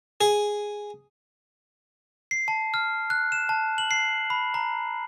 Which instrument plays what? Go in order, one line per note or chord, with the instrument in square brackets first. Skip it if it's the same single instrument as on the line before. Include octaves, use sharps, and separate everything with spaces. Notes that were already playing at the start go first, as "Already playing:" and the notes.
[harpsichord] G#4
[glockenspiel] C7
A5
F6
F#6
E7
A5
F#7
C7
B5
A#5